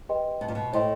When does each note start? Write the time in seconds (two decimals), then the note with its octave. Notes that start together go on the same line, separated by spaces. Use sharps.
0.09 G4 B4 D#5 G5 C6
0.41 B2
0.48 A#2
0.55 B2
0.73 A2 C5 D#5 G5 C6